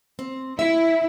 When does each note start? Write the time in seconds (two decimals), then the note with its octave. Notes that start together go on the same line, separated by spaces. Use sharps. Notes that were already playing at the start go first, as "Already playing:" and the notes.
0.19 C4
0.59 E4 E5